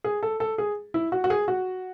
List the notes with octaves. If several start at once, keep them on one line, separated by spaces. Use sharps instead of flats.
G#4
A4
A4
G#4
E4
F#4
F#4
G#4
F#4